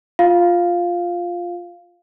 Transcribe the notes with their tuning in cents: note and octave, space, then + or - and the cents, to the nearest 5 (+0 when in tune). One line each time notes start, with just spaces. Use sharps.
F4 +5 F5 +0